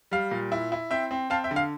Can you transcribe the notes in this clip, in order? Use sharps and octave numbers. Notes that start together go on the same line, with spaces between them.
G3 F5
A#2
E4
E4
C4 E5 G5
C4
C4 F5 A5
E5 G5
D3
F5